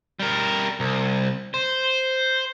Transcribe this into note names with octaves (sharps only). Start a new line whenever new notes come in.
G3 A#4
C2
C5